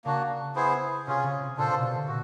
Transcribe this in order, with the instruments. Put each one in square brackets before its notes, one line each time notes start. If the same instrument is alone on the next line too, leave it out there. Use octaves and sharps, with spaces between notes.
[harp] C#3 [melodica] A#3 D4 F#4
[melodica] B3 E4 G#4 C5
[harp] C3 [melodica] C#4 F4 G#4
[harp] C#3
C3
[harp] A#2 [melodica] D4 F4 A4 C5
[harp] B2
C3
D3
[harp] A#2 [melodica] F#4